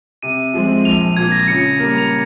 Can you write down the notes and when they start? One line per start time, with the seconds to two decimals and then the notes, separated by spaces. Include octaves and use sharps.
0.23 C3 D#7
0.53 F3 G#3 C4
0.85 A#1 F7
1.01 F7
1.17 A#2 F3 G#6
1.32 A#6
1.47 C#3 C#7
1.80 G3 A#3
1.98 F7